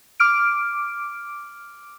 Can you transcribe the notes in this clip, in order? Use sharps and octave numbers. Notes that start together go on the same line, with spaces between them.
D6 F6 D7